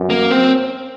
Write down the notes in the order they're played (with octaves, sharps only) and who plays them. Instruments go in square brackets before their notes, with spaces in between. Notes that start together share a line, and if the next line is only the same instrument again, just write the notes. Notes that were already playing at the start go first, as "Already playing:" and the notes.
Already playing: [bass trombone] F#2
[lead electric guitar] A#3
C4